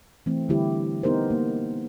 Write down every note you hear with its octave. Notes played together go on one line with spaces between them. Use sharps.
E3 A3 C4
D3 G3 E4 G4
B3 D#4 G4 A#4 C5
A#3